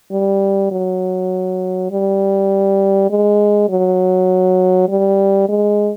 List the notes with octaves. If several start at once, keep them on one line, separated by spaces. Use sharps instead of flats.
G3
F#3
G3
G#3
F#3
G3
G#3